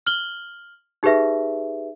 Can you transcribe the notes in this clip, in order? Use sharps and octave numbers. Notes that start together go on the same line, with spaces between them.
F6 F#7 G7
D#4 G4 G#4 B4 E5